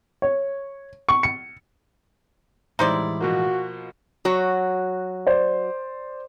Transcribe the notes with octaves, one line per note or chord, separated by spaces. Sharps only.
C#5
C#6
C#7
A2 E3 G3 G#3 D#4 E4 C5 D5
B2 F3 A#3 F#4
F#3 F#4 C#5
C5 D5